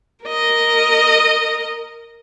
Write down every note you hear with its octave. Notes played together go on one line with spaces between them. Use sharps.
A#4 D#5